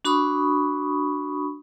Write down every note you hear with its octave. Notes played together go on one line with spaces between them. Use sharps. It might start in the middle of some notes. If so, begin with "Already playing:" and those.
D4 F#4 B5 C#6 D#6